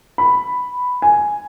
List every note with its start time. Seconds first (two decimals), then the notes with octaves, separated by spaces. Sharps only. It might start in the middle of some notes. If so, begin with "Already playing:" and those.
0.18 B5
1.02 G#5